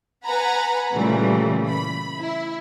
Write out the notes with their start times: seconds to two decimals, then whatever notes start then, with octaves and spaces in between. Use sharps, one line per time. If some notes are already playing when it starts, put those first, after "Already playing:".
0.23 B4 F#5 G#5 A#5 B5
0.93 A#2 C#3 E3 G3 A3
1.66 B5
2.18 E4